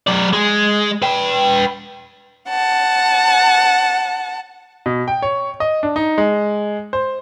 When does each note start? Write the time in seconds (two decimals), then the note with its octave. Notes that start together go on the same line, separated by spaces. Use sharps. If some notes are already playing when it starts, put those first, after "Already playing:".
0.07 F#3 D5
0.33 G#3
1.02 B4 G5
2.49 F#5 A5
4.86 B2
5.08 G5
5.22 C#5
5.60 D#5
5.83 D4
5.96 D#4
6.18 G#3
6.93 C5